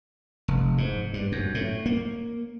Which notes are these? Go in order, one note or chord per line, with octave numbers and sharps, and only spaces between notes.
F1
G#2
G2
F#2
A2
A#3